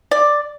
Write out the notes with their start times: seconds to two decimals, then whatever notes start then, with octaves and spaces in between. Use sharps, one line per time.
0.11 D5